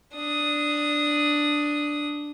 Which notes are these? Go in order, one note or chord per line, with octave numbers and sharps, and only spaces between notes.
D4 D#6